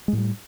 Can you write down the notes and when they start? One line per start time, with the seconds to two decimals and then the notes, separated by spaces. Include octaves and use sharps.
0.08 G#3
0.13 A2
0.18 G3